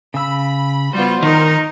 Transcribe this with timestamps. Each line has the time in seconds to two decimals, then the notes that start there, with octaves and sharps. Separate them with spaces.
0.14 C#3 B5 E6
0.93 G3 B3 F4 F#4 C5
1.23 D#3 D#4 A#4